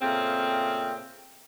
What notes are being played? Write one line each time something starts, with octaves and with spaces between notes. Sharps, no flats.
A#2 C#3 A3 C4